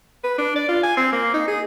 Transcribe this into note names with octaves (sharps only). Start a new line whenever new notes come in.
B4
D4
D5
F4
G#5
C4
A#3
D#4
G#4